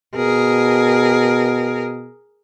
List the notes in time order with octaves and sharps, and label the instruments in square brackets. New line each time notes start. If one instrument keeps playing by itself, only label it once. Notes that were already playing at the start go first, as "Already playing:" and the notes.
[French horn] B2 [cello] G#4 A#4